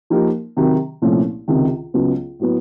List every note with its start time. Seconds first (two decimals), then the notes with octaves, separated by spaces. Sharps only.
0.10 F3 A#3 D#4 G4 A#4
0.57 C3 D#3 F#3
1.02 C2 A#2 F3 A3 C#4
1.48 C#2 C3 D#3
1.94 C#2 C#3 F#3 B3
2.40 A2 F#3 B3